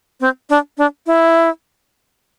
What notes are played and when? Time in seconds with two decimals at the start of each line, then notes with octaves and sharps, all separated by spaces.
0.20 C4
0.49 D4
0.78 D4
1.06 E4